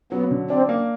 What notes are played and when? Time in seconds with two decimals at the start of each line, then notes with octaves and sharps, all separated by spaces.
0.12 F#3 B3
0.31 D3
0.50 C4 D4
0.69 A#3